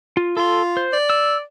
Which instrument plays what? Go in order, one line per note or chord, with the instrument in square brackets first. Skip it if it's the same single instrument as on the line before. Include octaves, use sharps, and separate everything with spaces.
[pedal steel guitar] F4
[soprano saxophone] F4 [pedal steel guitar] A4 C6
[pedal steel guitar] C5
[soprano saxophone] D5
[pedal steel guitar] E6